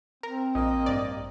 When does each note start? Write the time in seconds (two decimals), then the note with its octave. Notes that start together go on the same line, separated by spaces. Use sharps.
0.23 C4 A#4
0.55 A#1 A#3 D#5
0.86 A1 G2 D5